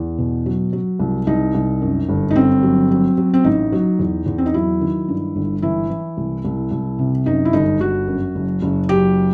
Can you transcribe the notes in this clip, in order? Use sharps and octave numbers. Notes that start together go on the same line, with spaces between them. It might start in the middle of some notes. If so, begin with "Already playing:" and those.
Already playing: E2
B2
F#3
F#3
C2
C2 D#4
C2
F#2
G1
D#4
G1 C4
F#3
F#3
F#3
C4
A1 D#4
F#3
E2
E2
C4
D#4
F#3 E4
D#3
G2
G1
E3 E4
E3
C2
C2
C2
C3
F#2 D#4
E4
G1 D#4
G1 F#4
F#2
F#1
F#1
F#3 G4